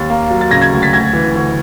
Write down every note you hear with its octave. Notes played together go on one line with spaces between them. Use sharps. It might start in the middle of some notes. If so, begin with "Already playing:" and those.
Already playing: D#2 A6
A#3
F#3
A6
C#3 G#6 A#6
G#6 A#6
D2
A6 B6
D2 G#6 A#6
E3
D2